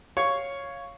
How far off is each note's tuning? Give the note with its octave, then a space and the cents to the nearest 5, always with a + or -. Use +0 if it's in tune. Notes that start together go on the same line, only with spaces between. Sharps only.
C#5 +0 F5 +0 C#6 +5